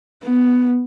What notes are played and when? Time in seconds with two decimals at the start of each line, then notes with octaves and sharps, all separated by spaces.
0.25 B3